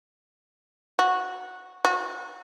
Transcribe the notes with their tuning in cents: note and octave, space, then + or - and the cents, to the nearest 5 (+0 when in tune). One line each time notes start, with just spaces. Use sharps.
F#4 -10
F#4 -30